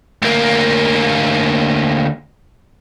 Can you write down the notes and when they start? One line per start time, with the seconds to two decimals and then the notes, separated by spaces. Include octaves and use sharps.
0.22 D2 A#3